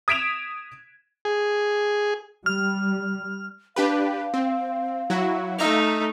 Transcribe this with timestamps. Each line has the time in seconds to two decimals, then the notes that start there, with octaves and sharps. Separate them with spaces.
0.08 D#6 G#6 B6 D7 E7 F7
1.25 G#4
2.46 G3 F6
3.76 D4 G4 B4 F5
4.34 C4
5.10 F#3 E4 F#4
5.59 A3 D#4 E5 A#5 F6